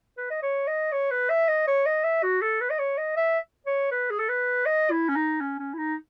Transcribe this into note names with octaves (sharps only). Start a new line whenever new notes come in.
B4
D#5
C#5
D#5
C#5
B4
E5
D#5
C#5
D#5
E5
F#4
A4
B4
D#5
C#5
D#5
E5
C#5
B4
G#4
A4
B4
D#5
E4
C#4
D#4
C#4
C#4
E4
D#4